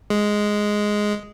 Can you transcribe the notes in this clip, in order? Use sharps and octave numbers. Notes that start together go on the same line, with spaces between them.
G#3